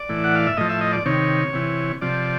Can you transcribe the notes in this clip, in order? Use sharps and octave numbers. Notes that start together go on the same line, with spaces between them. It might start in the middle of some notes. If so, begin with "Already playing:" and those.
Already playing: D5
A2 E3
F#5
F5
E5
A2 F3 D#5
E5
D#5
D5
C3 D#3 C#5
C3 E3
C3 F3 D5